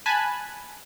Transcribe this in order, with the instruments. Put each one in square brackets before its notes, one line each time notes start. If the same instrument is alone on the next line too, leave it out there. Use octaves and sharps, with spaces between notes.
[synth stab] G#5 A5 B5 F#6